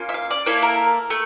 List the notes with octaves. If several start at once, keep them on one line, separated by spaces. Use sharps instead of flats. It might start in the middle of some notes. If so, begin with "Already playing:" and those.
Already playing: A#3 C#4 F4
E5
F5
D5
A#3 E4 A4 C#5
A#4
A3